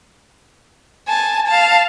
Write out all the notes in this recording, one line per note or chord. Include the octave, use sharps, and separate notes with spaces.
G#5 A5
F5 A5